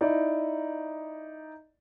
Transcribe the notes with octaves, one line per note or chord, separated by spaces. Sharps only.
D#4 E4 D5 D#5